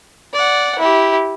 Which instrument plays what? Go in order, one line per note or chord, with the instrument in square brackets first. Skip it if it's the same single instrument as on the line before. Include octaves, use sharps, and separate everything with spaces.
[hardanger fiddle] D5 F#5
E4 G4